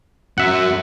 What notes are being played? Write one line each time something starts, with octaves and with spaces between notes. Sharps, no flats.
F#2 E5 F#5